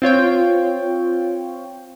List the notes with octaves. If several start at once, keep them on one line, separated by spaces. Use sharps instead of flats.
C4 F4 C#5 G5